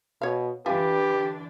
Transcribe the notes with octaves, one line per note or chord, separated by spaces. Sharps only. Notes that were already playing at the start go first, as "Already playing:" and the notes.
B2 C#5 F5
D3 E3 D4 F4 G4 B4 E5 G#5